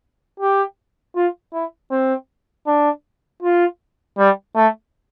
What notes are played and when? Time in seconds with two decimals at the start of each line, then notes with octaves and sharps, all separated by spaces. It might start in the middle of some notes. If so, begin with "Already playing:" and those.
0.40 G4
1.16 F4
1.53 E4
1.91 C4
2.67 D4
3.43 F4
4.18 G3
4.56 A3